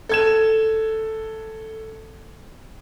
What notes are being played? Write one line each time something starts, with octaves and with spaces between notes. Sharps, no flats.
A4 G#6 E7